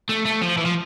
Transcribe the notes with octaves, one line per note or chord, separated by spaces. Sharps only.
A3
A3
F3
E3
F3